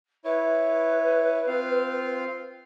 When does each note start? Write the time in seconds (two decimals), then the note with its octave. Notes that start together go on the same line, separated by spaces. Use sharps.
0.25 E4 B4 C#5
1.47 C4 F4 F5